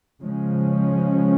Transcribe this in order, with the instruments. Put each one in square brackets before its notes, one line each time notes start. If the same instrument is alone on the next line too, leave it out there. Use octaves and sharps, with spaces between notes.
[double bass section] C#3 F3 G#3 C#4